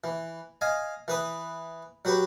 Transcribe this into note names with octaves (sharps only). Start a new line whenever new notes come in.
E3
D#5 F5 G#5
E3 B4 D#6
F#3 F#4 G4 B4